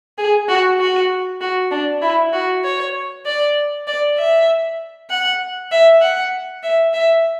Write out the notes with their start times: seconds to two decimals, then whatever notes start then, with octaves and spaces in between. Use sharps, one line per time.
0.18 G#4
0.49 F#4
0.80 F#4
1.41 F#4
1.72 D4
2.02 E4
2.33 F#4
2.64 C#5
3.26 D5
3.88 D5
4.18 E5
5.10 F#5
5.72 E5
6.02 F#5
6.63 E5
6.94 E5